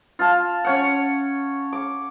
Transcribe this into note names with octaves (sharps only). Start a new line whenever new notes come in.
F4 F5 A5
C#4 C#5 F#5
D6